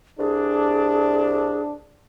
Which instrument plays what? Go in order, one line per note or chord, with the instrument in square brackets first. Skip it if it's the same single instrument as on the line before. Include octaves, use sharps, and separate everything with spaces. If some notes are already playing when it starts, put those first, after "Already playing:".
[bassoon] C2 [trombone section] D4 [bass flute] G#4